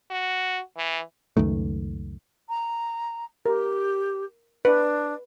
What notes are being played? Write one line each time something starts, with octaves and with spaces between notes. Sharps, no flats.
F#4
E3
C#2 F#2 D#3 A3
A#5
G4 A#4
D4 B4